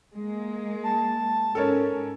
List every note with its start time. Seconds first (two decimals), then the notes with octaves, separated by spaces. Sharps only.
0.16 G#3 A#3
0.84 A5
1.55 G#2 C#4 A4 A#4 C#5